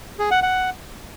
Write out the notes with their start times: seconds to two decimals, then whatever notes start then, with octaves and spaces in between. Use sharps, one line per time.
0.19 G#4
0.31 F#5
0.43 F#5